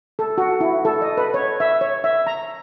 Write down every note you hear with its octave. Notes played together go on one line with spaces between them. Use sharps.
A4
F#4
E4
A4
D#5
B4
C#5
E5
C#5
E5
A#5